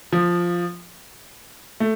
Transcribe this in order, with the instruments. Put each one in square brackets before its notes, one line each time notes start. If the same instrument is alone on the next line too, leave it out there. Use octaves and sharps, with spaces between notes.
[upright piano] F3
A3